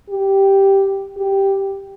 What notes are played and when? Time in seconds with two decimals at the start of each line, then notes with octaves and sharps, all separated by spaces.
0.10 G4
1.17 G4